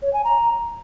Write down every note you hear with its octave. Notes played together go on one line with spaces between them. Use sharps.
C#5
G#5
A#5